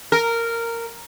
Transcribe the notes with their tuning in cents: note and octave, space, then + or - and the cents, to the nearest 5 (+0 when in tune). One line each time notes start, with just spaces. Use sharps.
A#4 -10